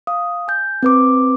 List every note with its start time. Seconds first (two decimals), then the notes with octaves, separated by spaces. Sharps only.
0.07 F5 D#6
0.48 G#5 G6
0.83 C4 B4 D6